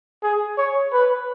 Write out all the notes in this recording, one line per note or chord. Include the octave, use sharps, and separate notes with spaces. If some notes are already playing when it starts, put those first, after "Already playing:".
G#4
C#5
B4